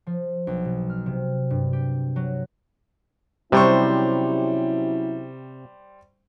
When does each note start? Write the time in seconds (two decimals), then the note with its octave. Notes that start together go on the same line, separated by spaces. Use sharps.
0.07 F3
0.47 B1
0.65 B2
0.90 F6
1.06 C3
1.50 G2
1.73 G4
2.16 F#3
3.52 C3 F#3 G3 C#4 E4 C5 C#6